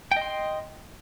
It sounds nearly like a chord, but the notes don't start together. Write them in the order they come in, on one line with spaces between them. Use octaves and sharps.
G5 D#5 C6